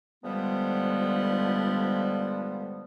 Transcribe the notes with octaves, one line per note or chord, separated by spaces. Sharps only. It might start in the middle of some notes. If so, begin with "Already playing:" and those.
G2 D3 F3 G3 G#3 B3